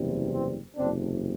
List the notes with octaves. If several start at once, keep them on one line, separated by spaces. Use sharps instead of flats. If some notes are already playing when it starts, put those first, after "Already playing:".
Already playing: F#1 E2 C3 E3 G3
C4
F#1 E2 C3 C4 D4